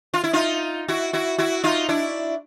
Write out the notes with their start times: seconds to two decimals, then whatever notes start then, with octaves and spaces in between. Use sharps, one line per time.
0.14 F4
0.24 E4
0.33 D#4 F4
0.88 E4 F#4
1.13 E4 F#4
1.38 E4 F#4
1.64 D#4 F4
1.89 D4 E4